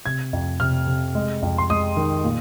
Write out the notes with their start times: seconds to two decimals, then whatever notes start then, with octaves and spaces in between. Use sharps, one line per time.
0.06 C3 G#6
0.33 F2
0.60 C3 F6
0.87 C3
1.15 G#3
1.42 F2
1.58 C6
1.70 G#3 D#6
1.97 D#3
2.24 A#2